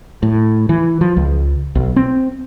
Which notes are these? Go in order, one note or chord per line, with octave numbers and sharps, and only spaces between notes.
A2
E3
F3
C#2
B1
C4